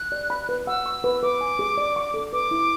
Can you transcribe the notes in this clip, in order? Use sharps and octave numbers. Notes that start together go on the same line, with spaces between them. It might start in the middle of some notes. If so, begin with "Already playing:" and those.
Already playing: F#6
D5
B5
B4
F#5 E6
C#6
B4
B4 D6
G#5
G#4
D5
C#6
A4
B4 D6
E4